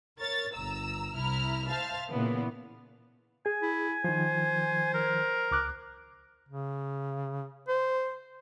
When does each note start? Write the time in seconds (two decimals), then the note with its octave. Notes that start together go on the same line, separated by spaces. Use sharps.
0.18 A#4 C#5 A6
0.54 G1 A#5 E6
1.15 C2 E4 A#5 F6
1.68 C5 E5 F5 A5 F6 A6
2.09 A#2 C#3 E3 B3
3.46 G#4 G#5
3.62 E4
4.04 D#3 F3 C5
4.94 A#4
5.51 C#2 D6 F#6
6.49 C#3
7.68 C5